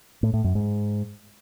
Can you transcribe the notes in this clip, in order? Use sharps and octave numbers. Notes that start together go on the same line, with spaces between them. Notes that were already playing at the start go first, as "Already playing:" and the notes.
A2
A2
F#2
G#2